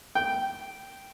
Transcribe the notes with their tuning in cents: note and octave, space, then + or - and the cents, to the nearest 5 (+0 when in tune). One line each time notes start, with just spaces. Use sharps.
G5 -5